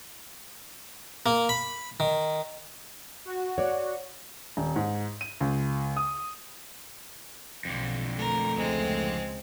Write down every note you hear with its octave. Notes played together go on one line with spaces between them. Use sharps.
A#3
B5
D#3
F#4
C#5 D5
D#1
G#2
D#7
C#2
D#6
B1 F2 D3
A3 A#4
C#2 G#3 C4